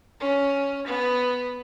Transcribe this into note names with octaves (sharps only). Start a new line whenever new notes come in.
C#4
B3